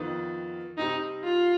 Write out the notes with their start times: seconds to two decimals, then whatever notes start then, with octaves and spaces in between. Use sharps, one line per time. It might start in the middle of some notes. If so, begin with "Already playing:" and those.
Already playing: F2 D#3 B3 D#4
0.78 C3 G3 C4 D#4 G4
1.24 F4